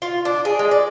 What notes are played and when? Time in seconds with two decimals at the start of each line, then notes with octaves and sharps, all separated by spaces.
0.02 F4
0.25 D4
0.45 G#4
0.59 G#3
0.71 D5